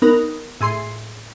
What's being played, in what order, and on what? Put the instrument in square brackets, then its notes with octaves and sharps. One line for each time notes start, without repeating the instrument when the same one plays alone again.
[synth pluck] B3 D#4 A#4
A2 G#4 C6 C7